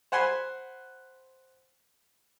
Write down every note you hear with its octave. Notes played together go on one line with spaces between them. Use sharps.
C5 F#5 G#5 B5 C6